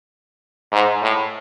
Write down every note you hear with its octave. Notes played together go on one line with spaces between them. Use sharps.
G#2
A2